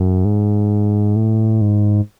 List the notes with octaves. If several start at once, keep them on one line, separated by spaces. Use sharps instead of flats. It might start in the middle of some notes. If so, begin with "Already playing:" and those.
Already playing: F#2
G#2
A2
G#2